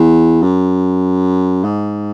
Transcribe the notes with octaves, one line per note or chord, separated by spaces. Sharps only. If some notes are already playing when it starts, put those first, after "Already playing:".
Already playing: E2
F#2
G#2